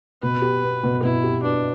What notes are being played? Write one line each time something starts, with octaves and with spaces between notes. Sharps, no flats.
B2 B4
G4
B3
B2
B2 E4
G4
B3 D4